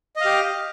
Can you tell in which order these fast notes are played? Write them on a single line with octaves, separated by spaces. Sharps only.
D#5 F5 G4